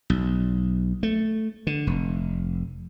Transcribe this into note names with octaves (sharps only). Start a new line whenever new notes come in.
B1
A3
D3
F1